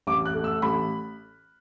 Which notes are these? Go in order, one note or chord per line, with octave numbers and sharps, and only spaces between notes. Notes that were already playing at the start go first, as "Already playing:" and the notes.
A1 D6
F#6
A3
E6
A1 B5